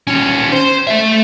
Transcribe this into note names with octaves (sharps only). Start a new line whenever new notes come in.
D#2 C#4
C5
A3 E5